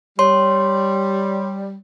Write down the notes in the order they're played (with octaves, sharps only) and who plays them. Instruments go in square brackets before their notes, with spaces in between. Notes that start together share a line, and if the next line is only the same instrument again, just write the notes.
[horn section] G3 [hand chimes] C#5 C6